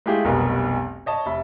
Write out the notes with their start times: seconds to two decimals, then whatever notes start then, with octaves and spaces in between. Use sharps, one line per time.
0.06 G#3 A3 E4 F4 G4 G#4
0.25 F1 B1 G2 B2 A#4 B4
1.06 C#5 D#5 A5
1.26 F1 E5 B5